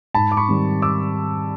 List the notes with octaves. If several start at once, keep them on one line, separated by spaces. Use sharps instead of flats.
G#2 A5 B5
D6
B5 C#6
D#3 G3 C4
D6 E6